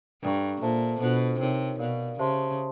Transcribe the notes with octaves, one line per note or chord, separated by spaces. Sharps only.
G2 A4 D5 G5 A#5 C#6
A#2 A4 C5 E5 A5
B2 D4 F4 A4 C5
C3 D#4 G4 A#4 C#5
B2 A#4 D5 F5
C#3 G4 C5 E5 A5 C6